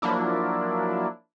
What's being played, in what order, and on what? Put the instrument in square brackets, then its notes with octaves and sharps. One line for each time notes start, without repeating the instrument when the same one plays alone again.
[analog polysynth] F3 F#3 A#3 D4 E4